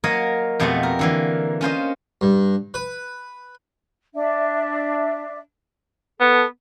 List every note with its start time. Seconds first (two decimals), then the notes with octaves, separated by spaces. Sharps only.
0.04 F#3 A#3 A#4 C#5 D#5
0.60 F2 B2 A3 F4 G4 F#5
0.83 A#4
0.99 D3 E3 A#3
1.61 C#4 F4 C5 D#5
2.21 G2
2.74 B4
4.15 D4 E5
6.20 B3 A4